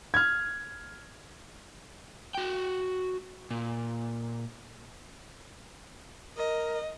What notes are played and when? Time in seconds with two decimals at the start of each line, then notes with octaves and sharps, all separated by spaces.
0.14 F6 G#6
2.35 F#4 G5
3.51 A#2
6.37 A#4 D#5